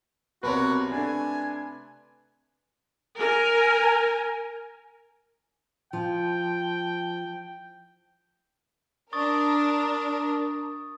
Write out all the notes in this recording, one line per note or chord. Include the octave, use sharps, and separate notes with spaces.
B1 C3 F#4 A#4 B4 C#5
A3 D4 G#5
A#4 G#5
F3 G5
D4 A#4 C#6 D#6 A6